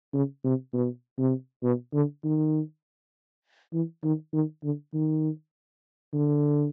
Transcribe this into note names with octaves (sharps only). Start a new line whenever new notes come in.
C#3
C3
B2
C3
B2
D3
D#3
E3
D#3
D#3
D3
D#3
D3